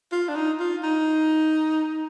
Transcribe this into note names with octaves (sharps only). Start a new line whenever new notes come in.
F4
D4
D#4
F4
D#4